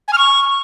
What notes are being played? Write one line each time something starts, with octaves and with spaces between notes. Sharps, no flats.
G#5
F6
C#6